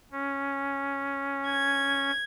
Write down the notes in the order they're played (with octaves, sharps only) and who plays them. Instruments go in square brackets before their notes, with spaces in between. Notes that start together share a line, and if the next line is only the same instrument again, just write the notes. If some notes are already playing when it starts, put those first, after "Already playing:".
[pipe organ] C#4
[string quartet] G#6